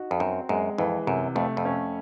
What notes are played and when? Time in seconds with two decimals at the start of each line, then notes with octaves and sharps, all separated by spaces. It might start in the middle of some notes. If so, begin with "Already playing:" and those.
Already playing: D#4 F#4
0.11 F2
0.20 F#2 C4
0.49 F#2 G#3
0.78 F2 E3
1.07 F#2 C3
1.35 F2 A3
1.57 F2
1.65 C#4